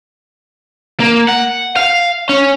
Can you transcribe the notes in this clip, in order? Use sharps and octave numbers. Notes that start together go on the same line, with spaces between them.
A#3
F#5
F5
C#4